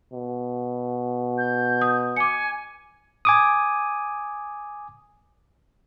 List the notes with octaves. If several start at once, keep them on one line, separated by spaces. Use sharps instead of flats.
B2
G6
D#6
G#5 D6 C#7
G#5 D6 D#6